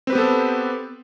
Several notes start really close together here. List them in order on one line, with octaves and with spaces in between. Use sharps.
C4 B4 G4 B3 A4